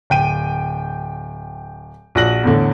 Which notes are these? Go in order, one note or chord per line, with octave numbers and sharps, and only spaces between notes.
D1 G5 D#7
A#1 F#4 F#6 A#6 F#7
E2 A2 D3